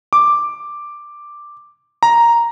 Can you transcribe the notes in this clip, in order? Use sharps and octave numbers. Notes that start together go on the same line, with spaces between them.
D6
A#5